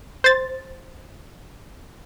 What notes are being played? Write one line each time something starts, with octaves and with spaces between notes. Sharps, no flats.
C5 A6